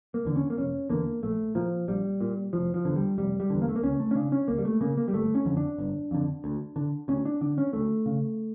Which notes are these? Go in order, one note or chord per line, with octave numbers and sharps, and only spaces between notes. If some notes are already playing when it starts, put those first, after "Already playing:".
A#3
E2 D3
C#4
A#3
F1 C#4
E2 D3 A#3
A#1 A3
A#2 F3
A#1 G3
A#2
F1 F3
F3
E2 D3
G3
F1 G3
G3
E2 D3
A#3
A3
A#3
C#2 C#4
A3
C#4
C#3 D4
C#4
C#2 A#3
G3
A3
C#3 A#3
A#3
G3
G1 A3
C#4
F2 D3
D4
G1
F2 D3
D2
D3
D2 C#4
D4
D3 D4
C#4
D2 A3
C#3